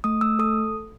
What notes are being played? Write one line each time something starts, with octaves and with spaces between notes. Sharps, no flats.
A3 D#6
A3 E6
A4 D#6